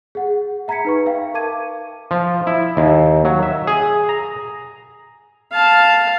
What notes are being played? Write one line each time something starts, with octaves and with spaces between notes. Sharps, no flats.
G#4 F#5
E5 A#5 B5 G#6 B6 C#7
D#4 B4 C#6
E5 F5 G5
A#4 F5 A5 D6 G#6 D#7
F3
E4
D#2
F#3
E5
G#4
A#5
F5 A5